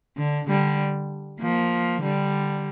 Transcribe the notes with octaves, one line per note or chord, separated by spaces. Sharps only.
D3
D3 G3
F3 A#3
D3 G3